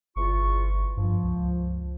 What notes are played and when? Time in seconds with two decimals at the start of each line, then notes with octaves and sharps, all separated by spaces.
0.16 G1 E2 F4 C#6
0.97 G2 F3
1.24 C#2